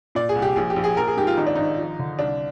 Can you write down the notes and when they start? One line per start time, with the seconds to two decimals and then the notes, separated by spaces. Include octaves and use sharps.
0.15 A#2 D5
0.29 G#4
0.35 C2
0.42 G4
0.56 A#1 G#4
0.70 G4
0.76 A#1
0.84 G#4
0.97 A#1 A#4
1.07 G#4
1.17 G#2 G4
1.27 F4
1.37 G#1 D#4
1.47 D4
1.55 G#1 D#4
1.78 F3
1.99 D3
2.19 C2 D4